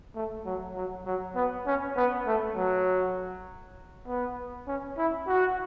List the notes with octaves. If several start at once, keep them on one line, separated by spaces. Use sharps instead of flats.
A3
F#3
F#3
F#3
B3
C#4
B3
A3
F#3
B3
C#4
E4
F#4